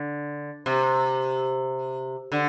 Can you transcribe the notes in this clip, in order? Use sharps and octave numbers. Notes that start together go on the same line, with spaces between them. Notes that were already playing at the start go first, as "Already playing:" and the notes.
Already playing: D3
C3
D3